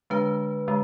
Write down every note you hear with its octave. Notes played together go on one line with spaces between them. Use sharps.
D3 G#3 D4 B4
D3 G#3